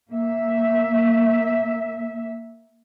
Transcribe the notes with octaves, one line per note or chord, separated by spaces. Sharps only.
A#3 E5